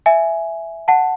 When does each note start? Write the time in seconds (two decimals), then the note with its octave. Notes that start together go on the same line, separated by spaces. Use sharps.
0.06 E5 G#5
0.88 F#5 A5